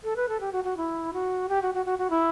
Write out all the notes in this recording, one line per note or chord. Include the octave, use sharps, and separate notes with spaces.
A4
B4
A4
G4
F#4
F#4
E4
F#4
G4
F#4
F#4
F#4
F#4
E4